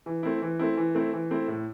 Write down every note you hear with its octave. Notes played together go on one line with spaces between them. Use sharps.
E3
A3 C4 E4
E3
A3 C4 E4
E3
A3 C4 E4
E3
A3 C4 E4
A2